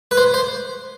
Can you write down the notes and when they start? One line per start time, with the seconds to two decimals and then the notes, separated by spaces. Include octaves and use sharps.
0.11 B4
0.17 C5
0.34 C5